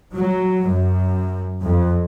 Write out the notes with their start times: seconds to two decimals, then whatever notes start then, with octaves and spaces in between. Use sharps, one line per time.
0.14 F#3
0.66 F#2
1.62 F2